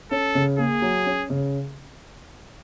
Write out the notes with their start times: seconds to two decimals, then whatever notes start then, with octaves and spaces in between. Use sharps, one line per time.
0.11 C#4 A4
0.35 C#3
0.58 A#3 G#4
0.82 F#3
1.06 C#4
1.30 C#3